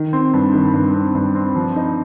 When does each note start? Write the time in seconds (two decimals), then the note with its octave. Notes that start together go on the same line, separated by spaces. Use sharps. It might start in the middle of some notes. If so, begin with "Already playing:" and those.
Already playing: D#3
0.13 C4
0.33 G2
0.54 D#3
0.74 G2
0.94 C4
1.15 G2
1.35 C4
1.55 F3
1.76 D#4